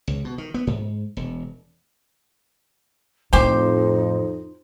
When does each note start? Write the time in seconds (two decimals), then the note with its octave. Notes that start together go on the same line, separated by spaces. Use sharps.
0.07 C#2
0.25 B2
0.38 D#3
0.54 B3
0.67 G#2
1.17 E1
3.33 F2 A2 D#3 D#4 G4 C5